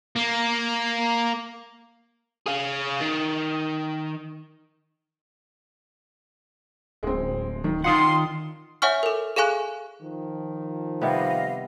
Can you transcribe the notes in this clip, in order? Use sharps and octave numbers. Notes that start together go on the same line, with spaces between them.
A#3
G#4 F5
D#3
D1 G#3 C4
D#3
D#3 F4 F5 F#5 C6 D#6
C#5 E5 F#5 G#5 C#6 F6
A4 A#4
G#4 A4 F5 G#5 C#6 F#6
D#3 F3
C3 G3 B3 D#5 F5